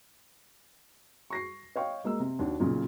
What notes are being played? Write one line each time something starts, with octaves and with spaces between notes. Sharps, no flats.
C#6 A#6 C7
C#5 D#5 F5 G5 C#6
G#3 A#3 D#5 E6
C3
D#2 D4 F#4
B1 A#2 C#3